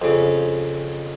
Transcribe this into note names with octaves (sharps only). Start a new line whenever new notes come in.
F2 C#3